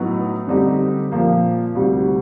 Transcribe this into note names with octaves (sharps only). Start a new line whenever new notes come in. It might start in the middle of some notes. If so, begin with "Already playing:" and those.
Already playing: A2 F#3 B3 D#4
D3 G3 C4 D#4 G4
A#2 F3 A#3
D2 C3 D#3 G3 C4